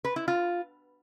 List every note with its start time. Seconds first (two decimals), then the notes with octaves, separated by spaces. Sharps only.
0.05 B4
0.16 E4
0.28 F4